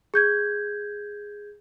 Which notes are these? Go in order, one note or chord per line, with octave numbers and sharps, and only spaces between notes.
G#4 G6 G#6